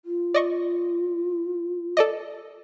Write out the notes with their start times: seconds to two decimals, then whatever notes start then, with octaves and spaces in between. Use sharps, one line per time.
0.05 F4
0.34 D5 D#5 C#6
1.97 A4 D5 D#5